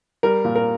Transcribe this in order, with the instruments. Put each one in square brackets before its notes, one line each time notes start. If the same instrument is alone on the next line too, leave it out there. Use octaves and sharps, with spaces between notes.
[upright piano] G3 A#4
A#2
A#4